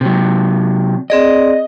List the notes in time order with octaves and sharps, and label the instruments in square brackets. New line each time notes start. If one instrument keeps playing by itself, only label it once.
[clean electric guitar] C3 F#3
[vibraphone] C4 G#4 D5 [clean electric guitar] D#5